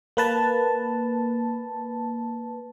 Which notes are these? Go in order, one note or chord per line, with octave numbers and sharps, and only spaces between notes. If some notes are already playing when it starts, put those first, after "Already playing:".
A#3 B4 A5